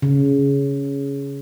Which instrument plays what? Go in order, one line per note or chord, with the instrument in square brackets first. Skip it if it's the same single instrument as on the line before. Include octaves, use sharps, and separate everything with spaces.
[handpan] C#3